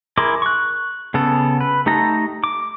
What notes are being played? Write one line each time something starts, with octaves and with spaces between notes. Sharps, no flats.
E4 G#4 A#4 C6 D6
C#6 F#6
C#3 B3 A4
B4
A3 D#4 G4 A4 A#5
D6